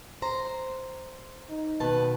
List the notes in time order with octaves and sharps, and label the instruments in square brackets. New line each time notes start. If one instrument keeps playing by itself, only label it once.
[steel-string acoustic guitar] C5 A#5
[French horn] D#4
[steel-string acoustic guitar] B2 D#3 A5 [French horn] B4